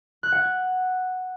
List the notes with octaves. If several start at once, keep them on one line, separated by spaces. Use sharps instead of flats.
F#6
F#5
G#6